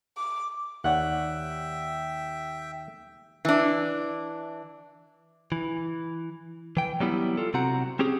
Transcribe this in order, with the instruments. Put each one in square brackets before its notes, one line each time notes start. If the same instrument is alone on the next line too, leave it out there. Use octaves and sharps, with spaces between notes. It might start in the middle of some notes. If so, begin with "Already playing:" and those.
[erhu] D6
[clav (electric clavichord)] D#2 C#5 D5 [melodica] E5 G5 [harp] F#5
[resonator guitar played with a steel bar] E3 D4
[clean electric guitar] E3
E3 G5
F#3 G3 B3 E4
F4 A4
C3 C4 F#4 F#5 A#5
C4 C#4 G4 G#4